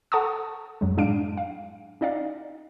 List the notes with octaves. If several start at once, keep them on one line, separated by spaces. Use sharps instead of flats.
A4 F#5 A5 A#5 C#6 D#6
F#2 F#3 G#3
A2 G#3 D4 F5 D7
F5
C#4 D#4 D5 D#5 F5